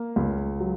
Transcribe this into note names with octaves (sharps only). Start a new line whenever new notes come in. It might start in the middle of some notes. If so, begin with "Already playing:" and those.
Already playing: A#3
C#2
F#3